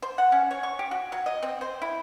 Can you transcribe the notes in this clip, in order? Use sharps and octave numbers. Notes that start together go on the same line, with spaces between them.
C5
F#5
C#4
C#5
C#6
G4
F#4
F#3
D#5
C4
C5
E4